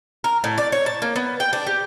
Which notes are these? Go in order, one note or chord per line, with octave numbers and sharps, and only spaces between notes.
A#4
A2
D5
C#5
A5
A#3
B3
G5
D4
G4